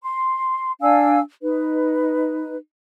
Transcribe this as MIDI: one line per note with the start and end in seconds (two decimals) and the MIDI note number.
0.03 0.72 84
0.81 1.19 62
0.81 1.19 77
0.81 1.19 80
0.81 1.19 88
1.42 2.56 63
1.42 2.56 71